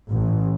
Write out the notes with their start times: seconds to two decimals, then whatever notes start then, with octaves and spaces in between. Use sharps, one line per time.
0.12 A1